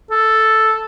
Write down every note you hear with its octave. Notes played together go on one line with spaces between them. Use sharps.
A4